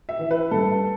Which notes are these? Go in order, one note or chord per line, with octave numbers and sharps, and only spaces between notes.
E5
E3
B4
G2 A4